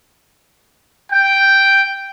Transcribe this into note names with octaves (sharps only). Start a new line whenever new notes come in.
G5